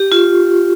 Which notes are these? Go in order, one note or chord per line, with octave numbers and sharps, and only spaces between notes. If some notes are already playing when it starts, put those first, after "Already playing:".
Already playing: G4
F4